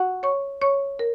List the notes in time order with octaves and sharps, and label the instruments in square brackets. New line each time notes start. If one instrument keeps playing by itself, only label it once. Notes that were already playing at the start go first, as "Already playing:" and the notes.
Already playing: [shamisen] F#4
[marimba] C#5 C#6
C#5 C#6
A#4